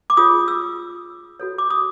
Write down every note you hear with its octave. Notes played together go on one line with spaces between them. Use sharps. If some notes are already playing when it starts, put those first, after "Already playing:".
D6
F4 G#4 C#5 D#6
E6
F#4 A4 C#5
D6
D#6